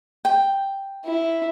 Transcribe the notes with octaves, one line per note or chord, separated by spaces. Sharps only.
G5
E4